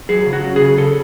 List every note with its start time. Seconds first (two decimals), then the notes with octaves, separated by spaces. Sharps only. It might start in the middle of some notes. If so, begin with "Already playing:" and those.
0.09 F#3 G#4
0.26 C#3
0.33 F#4
0.44 C#4
0.56 G#4
0.61 C#3
0.78 C#3 A4